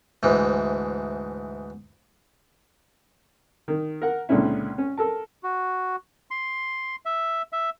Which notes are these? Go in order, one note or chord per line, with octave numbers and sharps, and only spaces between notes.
D2 G#2 E3
D#3
A#4 F#5
C#2 A#2 D3 C4 C#4 E4
C#4
A4 A#4 A5
F#4
C6
E5
E5